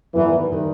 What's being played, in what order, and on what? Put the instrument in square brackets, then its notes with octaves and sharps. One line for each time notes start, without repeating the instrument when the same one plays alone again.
[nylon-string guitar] G#2 D#3 G3 B3 [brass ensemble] E3
[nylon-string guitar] D#3 G3